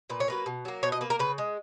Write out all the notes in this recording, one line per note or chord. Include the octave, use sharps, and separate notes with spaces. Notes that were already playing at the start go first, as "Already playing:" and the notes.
A#2 B4
C#5
F#3 A#3 B4
B2
F#3 A#3
B2 C#5
D#5
A#3 B4
A#4
C#3 B4
G#3